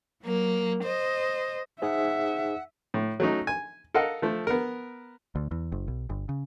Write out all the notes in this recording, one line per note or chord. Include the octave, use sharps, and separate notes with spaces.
F#3 A#3
C5 D#5
D#4 G#4 C5 E5 F#5
A2
F#3 A3 C#4 D#4
G#5
A4 A#4 D#5 F5 F#5
F3 A3
B3 A#4
D2
E2
F#1
B1
G1
C#3